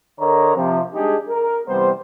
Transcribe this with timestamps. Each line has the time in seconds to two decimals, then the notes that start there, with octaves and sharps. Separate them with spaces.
0.19 D3 A#4 C#5 D#5 A#5
0.55 C3 F3
0.94 G3 G#3 D4 D#4 G4 G#4
1.29 A#4
1.68 C3 E3 G3 B3 C5